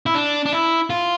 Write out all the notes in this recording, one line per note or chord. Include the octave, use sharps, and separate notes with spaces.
E4
D4
D4
E4
F4